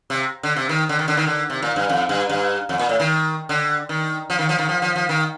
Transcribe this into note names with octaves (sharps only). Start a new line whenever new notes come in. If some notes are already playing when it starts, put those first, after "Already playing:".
C3
D3
C3
D#3
D3
D#3
D3
D#3
D3
C3
A#2
G2
F2
G2
G2
F2
A#2
A2
D#3
D3
D#3
F3
D#3
F3
D#3
F3
F3
F3
D#3